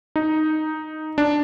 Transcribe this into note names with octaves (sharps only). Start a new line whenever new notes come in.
D#4
D4